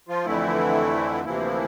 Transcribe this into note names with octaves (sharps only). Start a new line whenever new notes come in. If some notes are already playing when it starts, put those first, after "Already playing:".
F3 F4
F2 D3 E3 A3 E4
D2 C3 E3 F3 A#3 E4